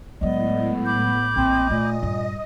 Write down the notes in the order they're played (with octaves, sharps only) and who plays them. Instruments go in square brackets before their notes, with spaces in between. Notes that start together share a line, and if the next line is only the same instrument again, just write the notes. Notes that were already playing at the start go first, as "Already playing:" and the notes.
[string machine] A2 [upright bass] F#3 G#3 [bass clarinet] B3 [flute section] D5 D#5
[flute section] B5 D6 G6
[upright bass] A#1 [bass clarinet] C4 [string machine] D#5
[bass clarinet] A#2 [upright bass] A3 [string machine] D#5
[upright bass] G2